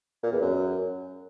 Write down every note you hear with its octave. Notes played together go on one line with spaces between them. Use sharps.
A#2
E2
F#2